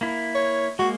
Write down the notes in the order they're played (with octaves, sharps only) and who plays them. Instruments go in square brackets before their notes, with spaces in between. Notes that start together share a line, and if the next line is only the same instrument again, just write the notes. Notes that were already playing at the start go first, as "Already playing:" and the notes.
[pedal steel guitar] A#3 E4
[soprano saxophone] C#5
[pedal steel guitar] G#3 A#3 [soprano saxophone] F#4